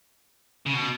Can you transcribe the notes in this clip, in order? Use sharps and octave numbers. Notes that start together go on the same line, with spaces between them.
C#3
B2